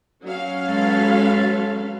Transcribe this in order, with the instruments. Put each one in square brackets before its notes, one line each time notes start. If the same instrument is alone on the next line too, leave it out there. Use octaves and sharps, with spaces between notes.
[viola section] F#3 C#4 F5
[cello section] G#3 A4 B4